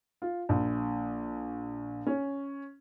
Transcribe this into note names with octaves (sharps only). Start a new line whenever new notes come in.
F4
A#1
C#4